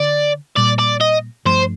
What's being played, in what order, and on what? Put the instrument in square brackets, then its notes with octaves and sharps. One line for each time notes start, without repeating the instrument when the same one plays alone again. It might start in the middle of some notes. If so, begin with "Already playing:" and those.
Already playing: [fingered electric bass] D3 [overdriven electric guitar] D5
[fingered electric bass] A#2 G3 A#3 [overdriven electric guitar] D5
[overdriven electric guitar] D5
D#5
[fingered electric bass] G2 F3 A3 D4 [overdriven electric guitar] C5